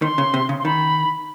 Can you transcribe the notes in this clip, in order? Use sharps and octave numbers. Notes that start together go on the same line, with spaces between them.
D#3 C6
C#3
C3
C#3
C6
D#3 B5